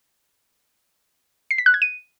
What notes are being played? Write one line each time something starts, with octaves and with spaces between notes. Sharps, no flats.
C7
B6
F#6
G#6
D#7